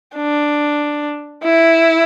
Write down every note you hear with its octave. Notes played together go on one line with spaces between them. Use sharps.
D4
E4